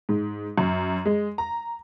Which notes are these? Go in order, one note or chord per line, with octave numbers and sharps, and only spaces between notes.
G#2
F#2
G#3
A#5